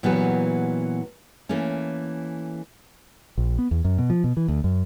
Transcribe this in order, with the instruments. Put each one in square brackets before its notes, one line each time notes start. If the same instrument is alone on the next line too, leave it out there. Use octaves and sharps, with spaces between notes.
[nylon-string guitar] A#2 E3 F#3 B3 G4 B4
E3 A3 A#3 C#4
[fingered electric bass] A#1
B3
E2
F#2
B2
F3
B2
E3
D2
F#2